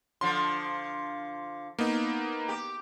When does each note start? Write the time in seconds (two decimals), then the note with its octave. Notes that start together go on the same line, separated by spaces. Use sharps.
0.21 D3 F3 C6
1.79 A#3 B3 D#4
2.48 G4